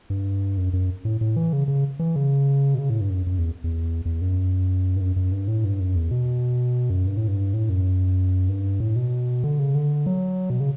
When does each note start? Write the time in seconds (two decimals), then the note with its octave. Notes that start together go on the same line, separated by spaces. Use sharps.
0.10 G2
0.57 F#2
0.73 F#2
1.05 A2
1.21 A2
1.36 E3
1.53 C#3
1.68 C#3
1.99 E3
2.16 C#3
2.74 B2
2.79 C#3
2.90 A2
3.01 G2
3.10 F#2
3.27 F#2
3.39 E2
3.64 E2
4.05 E2
4.21 F#2
4.96 G2
5.01 F#2
5.16 F#2
5.32 G2
5.48 A2
5.64 G2
5.80 F#2
5.95 E2
6.11 B2
6.90 F#2
7.06 G2
7.17 A2
7.28 G2
7.54 A2
7.69 F#2
8.49 G2
8.80 A2
8.96 B2
9.44 D3
9.59 C#3
9.75 D3
10.06 F#3
10.50 B2
10.60 C#3